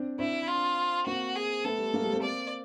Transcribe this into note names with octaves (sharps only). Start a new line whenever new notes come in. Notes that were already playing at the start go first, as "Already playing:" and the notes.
Already playing: C4 D4
C4 D4 E4
F4
A#3 C4 F#4
G#4
A3 B3 A4
G3 A3
G#3 A#3
G3
A#3 C4
D5